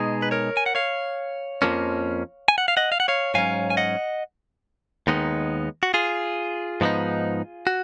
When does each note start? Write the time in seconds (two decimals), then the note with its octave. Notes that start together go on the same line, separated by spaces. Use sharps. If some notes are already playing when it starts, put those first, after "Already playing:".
Already playing: B2 G#3 D#4 G#4
0.22 B4
0.31 A#4 C#5
0.57 G#5
0.66 F#5
0.75 C#5 F5
1.62 F2 F3 A#3 C#4
2.48 G#5
2.58 F#5
2.68 F5
2.77 D#5 F#5
2.92 F5
3.00 F#5
3.08 C#5 F5
3.34 G#2 F#3 C#4 F5 G#5
3.70 G#5
3.77 D#5 F#5
5.07 D#2 D#3 G#3 B3 D#4
5.83 F#4
5.94 F4 G#4
6.81 G#2 F3 B3 D#4
7.67 F#4